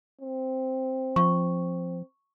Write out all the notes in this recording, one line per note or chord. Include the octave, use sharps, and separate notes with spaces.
C4
F3 C#6